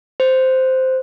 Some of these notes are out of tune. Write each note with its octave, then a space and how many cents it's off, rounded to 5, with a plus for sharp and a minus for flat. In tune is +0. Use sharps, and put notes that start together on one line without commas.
C5 -10